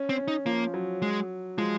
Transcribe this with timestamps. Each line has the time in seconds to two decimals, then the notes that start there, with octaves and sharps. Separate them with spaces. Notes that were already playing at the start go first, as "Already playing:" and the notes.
Already playing: C#4
0.09 C4
0.18 C#4
0.28 D#4
0.46 F3 A#3
0.74 F#3
1.02 G#3
1.58 F3 G#3